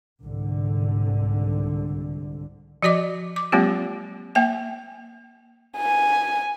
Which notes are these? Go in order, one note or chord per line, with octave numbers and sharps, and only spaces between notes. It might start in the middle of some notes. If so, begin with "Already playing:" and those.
C2 G#2 D3
F3 F#4 D5 D#5 D6
D6
F#3 G#3 A#3 C4 F4 G4
A#3 E5 G5 G#5
G#5